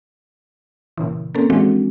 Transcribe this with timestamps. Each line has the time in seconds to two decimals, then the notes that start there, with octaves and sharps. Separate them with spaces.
0.97 A#2 C#3 E3
1.35 A#3 C4 C#4 A4
1.50 E3 F3 G#3 C4 D4 F#4